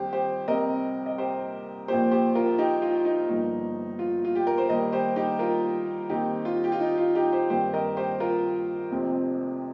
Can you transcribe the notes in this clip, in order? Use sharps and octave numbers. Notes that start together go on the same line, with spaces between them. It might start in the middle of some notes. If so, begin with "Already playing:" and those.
Already playing: F2 D#3 G3 A#3 G4 C5
G4 C5
C2 C3 G3 C4 A#4 D#5
D#5
G4 C5
A#1 A#2 F3 A#3 G4 C5
G4 C5
F4 A#4
D#4 G4
F4
D#4
G1 G2 F3 A#3 D#4
F4
F4
G4
A#4
C5
D#2 D#3 G3 A#4 D#5
G4 C5
D#4 G4
F4 A#4
D#2 D#3 C4 D#4 G4
F4
G4
F4
D#4
F4
D#4 G4
G4 C5
G2 D#3 C4 G4 C5
A#4 D#5
G4 C5
F4 A#4
F1 F2 C3 F3 C4